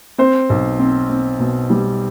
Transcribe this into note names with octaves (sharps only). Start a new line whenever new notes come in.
C4 C5
B1
C4
C4
B2
G3